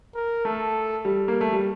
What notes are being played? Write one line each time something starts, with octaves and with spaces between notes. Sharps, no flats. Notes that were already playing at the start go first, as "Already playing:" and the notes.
A#4
A3 A4
G3
A#3
A3
G3